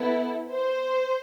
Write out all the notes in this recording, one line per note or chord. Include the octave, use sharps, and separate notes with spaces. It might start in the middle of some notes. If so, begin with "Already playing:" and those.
Already playing: B3 E4 A4
C5